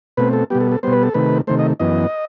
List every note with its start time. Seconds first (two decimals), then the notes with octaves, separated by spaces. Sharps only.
0.17 B2 A3 C4 B4
0.33 A4
0.50 B2 G3 B3 G4
0.61 A4
0.72 A4
0.83 B2 G3 B3 C5
0.93 B4
1.03 A4
1.14 C3 D#3 A3 B4
1.47 C3 D#3 A3 C5
1.59 D#5
1.80 F#2 E3 B3 D#5